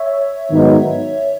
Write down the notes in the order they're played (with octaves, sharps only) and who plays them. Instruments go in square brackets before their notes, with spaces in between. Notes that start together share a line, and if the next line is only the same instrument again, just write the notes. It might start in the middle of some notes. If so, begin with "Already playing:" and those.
Already playing: [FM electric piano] C#5 E5
[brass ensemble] G#2 D#3 F#3 B3 D#4